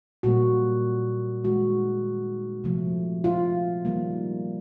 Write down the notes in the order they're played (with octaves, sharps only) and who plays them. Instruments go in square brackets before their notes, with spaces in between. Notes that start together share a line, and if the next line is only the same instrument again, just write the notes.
[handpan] A#2 G3 A#3 F#4
D#3 G#3 F#4
C3 F3 A3
F4
D#3 G3 A#3